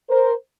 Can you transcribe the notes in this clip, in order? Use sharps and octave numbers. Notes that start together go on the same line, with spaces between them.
A#4 C5